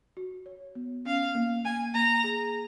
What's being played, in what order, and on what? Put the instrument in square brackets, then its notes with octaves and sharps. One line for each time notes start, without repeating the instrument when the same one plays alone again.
[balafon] F#4
C#5
B3
[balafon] C#4 [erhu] F5
[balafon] A#3
[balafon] A#3 [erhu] G#5
[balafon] A#3 [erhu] A#5
[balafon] G#4